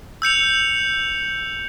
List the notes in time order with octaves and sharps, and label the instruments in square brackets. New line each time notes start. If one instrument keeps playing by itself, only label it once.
[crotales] E6 G6 C#7 F7